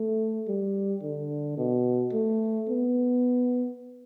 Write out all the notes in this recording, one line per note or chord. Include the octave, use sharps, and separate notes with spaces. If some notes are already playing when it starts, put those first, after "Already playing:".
Already playing: A3
G3
D3
B2
A3
B3